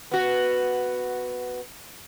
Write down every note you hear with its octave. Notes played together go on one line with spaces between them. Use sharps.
B3 F#4